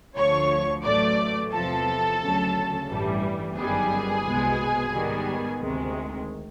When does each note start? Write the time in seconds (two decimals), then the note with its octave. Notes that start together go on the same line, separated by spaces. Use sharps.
0.16 D2 D3 F3 C#5 C#6
0.84 A1 A2 F#3 A3 D5 D6
1.52 E2 C3 F3 A4 A5
2.20 D2 C#3 F#3
2.88 A1 G2 E3 G3
3.56 G1 F#2 D#3 G3 B3 G#4 G#5
4.25 C2 B2 G#3 B3
4.93 G#2 D#3 G3 B3
5.60 D2 C3 D#3 G#3